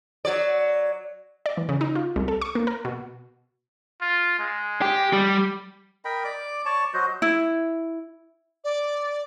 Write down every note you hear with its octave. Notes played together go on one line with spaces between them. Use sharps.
F#3 D5
D5
E3
C#3
D#4
F4
C2
A4
C#6
A#3
A#4
B2
F4
G#3
G4
G3
A#4 D#5 G5 B5
D5 D6
C#5 D5 A5 C#6
F#3 F#4 C5 D#5
E4
D5